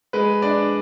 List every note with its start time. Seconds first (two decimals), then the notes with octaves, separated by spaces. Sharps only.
0.13 G#3 B4
0.42 D4 D5